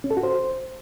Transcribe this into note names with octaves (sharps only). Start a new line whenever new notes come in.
C#4
A4
F#4
C5